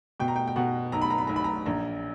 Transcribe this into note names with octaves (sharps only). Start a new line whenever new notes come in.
B2 G5
A#5
G5
G5
B2 F#5
B1 A#5
B5
A#5
B5
B1 A#5
B5
A#5
A#1 A#5